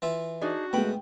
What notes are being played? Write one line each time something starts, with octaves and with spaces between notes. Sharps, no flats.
E3 F4 E5
D4 D#4 F#4 G#4
B2 G#3 A3 G5 B5